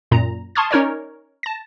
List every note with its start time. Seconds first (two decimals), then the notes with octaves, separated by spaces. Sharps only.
0.11 F#2 A#2 A#5
0.55 A5 C6 C#6 D#6 F6 G#6
0.71 C#4 D#4 A#4 C#5 D5
1.43 A5 A#6